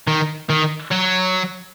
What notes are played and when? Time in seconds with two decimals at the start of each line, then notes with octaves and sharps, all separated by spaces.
0.07 D#3
0.50 D#3
0.92 F#3